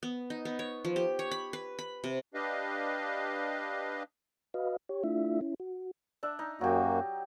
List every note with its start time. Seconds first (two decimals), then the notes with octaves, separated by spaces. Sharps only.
0.03 B3
0.30 D#4
0.45 B3
0.59 C#5
0.85 F3
0.96 G4
1.19 C#5
1.31 B5
1.53 B4
1.79 B5
2.04 C3
2.34 D4 G4 B4 D#5 F5
4.54 F#4 B4 D#5 F5
4.89 G4 C#5
5.04 A3 D4 E4 F4 E5
5.41 C#4 E4
5.60 F#4
6.23 D4 E5
6.39 D#4
6.61 F#2 F#3 A#3 F#4 G4